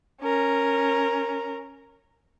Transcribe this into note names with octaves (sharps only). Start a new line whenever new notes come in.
C#4 A#4